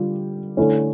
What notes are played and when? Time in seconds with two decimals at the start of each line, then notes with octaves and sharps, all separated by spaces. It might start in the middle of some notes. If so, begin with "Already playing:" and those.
Already playing: D3 G3 F4 G4
0.57 D3 A3 C#4 E4